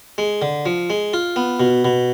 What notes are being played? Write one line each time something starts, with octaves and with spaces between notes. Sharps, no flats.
G#3
D3
F3
G#3
F4
B3
B2
B2